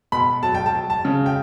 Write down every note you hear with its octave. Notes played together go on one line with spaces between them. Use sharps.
B2 B5
F#3 A5
G5
A5
F#3
A5
C#3
G5